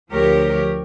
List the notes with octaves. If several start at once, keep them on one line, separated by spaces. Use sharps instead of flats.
D2 F3 G4 A#4 C#5